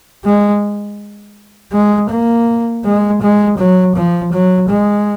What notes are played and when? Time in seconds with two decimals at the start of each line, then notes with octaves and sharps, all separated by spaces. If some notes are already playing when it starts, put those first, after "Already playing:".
0.24 G#3
1.72 G#3
2.10 A#3
2.84 G#3
3.21 G#3
3.58 F#3
3.95 F3
4.32 F#3
4.69 G#3